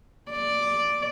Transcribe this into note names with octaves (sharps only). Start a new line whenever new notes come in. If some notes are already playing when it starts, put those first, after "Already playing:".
D5